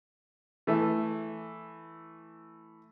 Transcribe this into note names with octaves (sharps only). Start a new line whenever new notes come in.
E3 A3